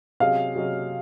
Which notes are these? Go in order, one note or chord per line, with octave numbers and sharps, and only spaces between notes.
C3 F#3 C#4 G#4 D#5 F5
C3 F#3 C#4 G#4 D#5